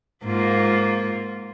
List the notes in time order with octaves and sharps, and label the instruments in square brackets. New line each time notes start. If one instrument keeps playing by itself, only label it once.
[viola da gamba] G#2 A#3 F4